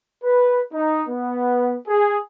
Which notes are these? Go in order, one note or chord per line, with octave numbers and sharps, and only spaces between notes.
B4
D#4
B3
G#4